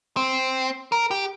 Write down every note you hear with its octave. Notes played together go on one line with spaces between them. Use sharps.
C4
A#4
G4